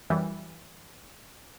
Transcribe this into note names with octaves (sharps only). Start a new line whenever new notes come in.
F#2 E3 G3